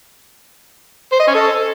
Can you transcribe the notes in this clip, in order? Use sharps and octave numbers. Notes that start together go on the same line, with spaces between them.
C5
D#5
C#4
A4